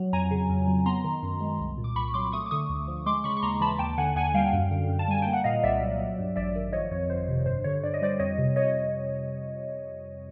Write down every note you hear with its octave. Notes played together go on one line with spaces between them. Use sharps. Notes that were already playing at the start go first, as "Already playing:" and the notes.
Already playing: F#3
F2 G#5 A#5
C#3
F2
F#3
B3 A#5 C6
D#3
F#2
G#3
C2
A#2
D6
C2 B5 C#6
F#3 C6 D6
A3 C#6 D#6
D6
D3 C#6 D#6
D2
F3
G#3 C6 D6
C#3 B5 C#6
C#6
D#2 A#5 C6
E3 A5 B5
D#2 G5 A5
D3 F#5 G#5
D#2 F#5 G#5
G3 F5 G5
F#2
D3
F#2
A5
G3 G#5
A#3 G5
F#5
A#2 D#5 F5
C2 D5 E5
F#3
F#3
G2
A1 D5 E5
D#3
F3 C#5 D#5
F2 C#5
G1 C5
C3
G2 C5
D3 C#5
G2 D5
D#5
G3 C5 D5
F2 C#5 D#5
C3
C#5 D#5